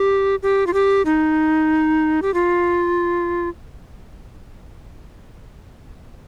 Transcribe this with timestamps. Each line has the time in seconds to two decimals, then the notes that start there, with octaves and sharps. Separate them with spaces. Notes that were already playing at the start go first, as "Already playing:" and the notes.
Already playing: G4
0.43 G4
0.67 F4
0.74 G4
1.05 D#4
2.22 G4
2.34 F4